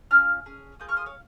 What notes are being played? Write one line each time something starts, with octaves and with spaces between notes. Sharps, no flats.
C#4 F4 F6
C#4 G#4
A#3 F4 G#4 D#6 G6
C#6 F6
C6 D#6
C#5 F5